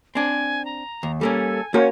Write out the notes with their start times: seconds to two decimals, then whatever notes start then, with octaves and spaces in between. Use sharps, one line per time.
0.15 C4 D4 G#5
0.65 A#5
1.03 D#2
1.21 G3 A#3 C#4 A4 G#5
1.74 A#3 C#4 F#4 A#4 C#5